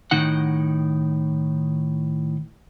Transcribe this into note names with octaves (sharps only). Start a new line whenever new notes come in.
A2 D#3 D#4 F#5